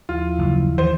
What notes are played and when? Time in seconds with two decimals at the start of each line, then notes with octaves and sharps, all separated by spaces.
0.09 D#2 F3 E4 F4
0.38 F#1
0.78 D#3 E3 C5